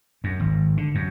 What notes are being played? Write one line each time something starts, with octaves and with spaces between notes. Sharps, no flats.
F#2
G#1
D3
F#2